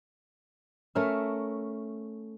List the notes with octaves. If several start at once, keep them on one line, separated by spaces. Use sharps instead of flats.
A3 C#4 A#4 E5